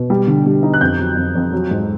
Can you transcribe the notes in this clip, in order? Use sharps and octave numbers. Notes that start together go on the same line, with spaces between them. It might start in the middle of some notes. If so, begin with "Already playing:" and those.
Already playing: B2
G3
D3
G3
D#4
F#6
F2 G6
F#3
F2
F2
F#3
G#2